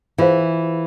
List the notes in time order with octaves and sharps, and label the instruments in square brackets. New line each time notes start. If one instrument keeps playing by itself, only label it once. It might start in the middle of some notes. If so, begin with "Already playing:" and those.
[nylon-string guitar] E3 [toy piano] F4 G#4 C5 F5